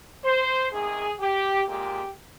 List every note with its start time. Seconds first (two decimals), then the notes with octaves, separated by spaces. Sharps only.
0.24 C5
0.71 C3 D#3 G#3 G#4
1.19 G4
1.66 A#2 G#3 G4